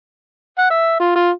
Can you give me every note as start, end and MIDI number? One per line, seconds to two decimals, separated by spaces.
0.59 0.66 78
0.70 0.98 76
1.00 1.15 65
1.15 1.30 65